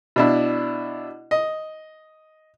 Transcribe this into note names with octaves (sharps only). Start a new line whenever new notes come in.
B2 D4 E4
D#5